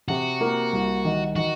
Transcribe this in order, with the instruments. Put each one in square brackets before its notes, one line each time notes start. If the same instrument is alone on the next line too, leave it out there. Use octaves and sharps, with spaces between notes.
[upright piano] C3 [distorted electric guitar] F#4
[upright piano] A#3
C2
D#3
[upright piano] D#3 [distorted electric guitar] F#4